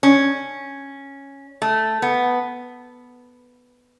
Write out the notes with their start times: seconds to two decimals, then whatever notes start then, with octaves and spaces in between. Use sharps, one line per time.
0.03 C#4
1.62 A3
2.02 B3